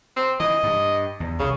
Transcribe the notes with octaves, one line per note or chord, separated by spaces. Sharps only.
C4
E3 D#5
G2
E2
C2 C#3